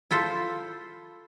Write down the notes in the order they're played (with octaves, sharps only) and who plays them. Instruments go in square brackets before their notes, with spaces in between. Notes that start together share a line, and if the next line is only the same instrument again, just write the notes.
[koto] E4 F4 A4 C5